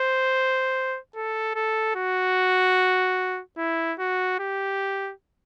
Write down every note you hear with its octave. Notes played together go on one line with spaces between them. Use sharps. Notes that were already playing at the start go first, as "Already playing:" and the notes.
Already playing: C5
A4
A4
F#4
E4
F#4
G4